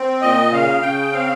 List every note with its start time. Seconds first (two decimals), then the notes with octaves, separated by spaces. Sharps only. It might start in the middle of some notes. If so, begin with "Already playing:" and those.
Already playing: C4
0.21 A#2 D#5
0.52 C#3 F5
0.82 C#3 G5
1.13 C4 F5